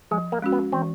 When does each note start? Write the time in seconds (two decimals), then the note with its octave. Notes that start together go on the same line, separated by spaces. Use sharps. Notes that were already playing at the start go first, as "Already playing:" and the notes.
0.11 F3 G#3
0.32 A#3
0.42 G#3 C#4 F#4
0.52 B3
0.72 E3 C4